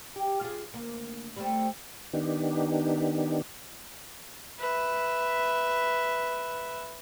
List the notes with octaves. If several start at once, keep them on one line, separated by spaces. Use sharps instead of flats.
G4
F4 G#4
D2 A#3
G3 A3 C4
D#3 B3 D4 D#4 G4
B4 E5